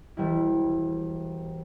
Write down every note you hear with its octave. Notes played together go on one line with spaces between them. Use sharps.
E1 G3 E4